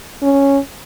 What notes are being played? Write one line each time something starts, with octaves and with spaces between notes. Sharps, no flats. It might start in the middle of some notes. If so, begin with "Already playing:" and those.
C#4